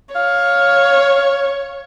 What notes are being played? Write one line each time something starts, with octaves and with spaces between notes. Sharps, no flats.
C#5 F5